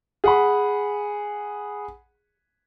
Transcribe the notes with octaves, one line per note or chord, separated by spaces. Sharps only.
G#4 F#5 B5